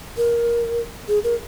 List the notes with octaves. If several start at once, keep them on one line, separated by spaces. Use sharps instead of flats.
A#4
G#4
A#4